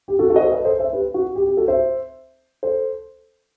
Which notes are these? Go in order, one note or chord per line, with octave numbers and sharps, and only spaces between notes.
G4
F#4 A4
F#4 A4
D#5
A4 C5
B4 D#5
A4 C5
C5 E5
G4 B4
F#4
G4
G4
F#4 A4
C5 E5
A4 C5